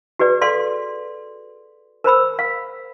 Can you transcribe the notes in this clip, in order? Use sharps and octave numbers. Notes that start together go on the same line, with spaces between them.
F#4 G#4 B4 D5
A4 D5 F5 C6
A#4 C5 B5 E6
F5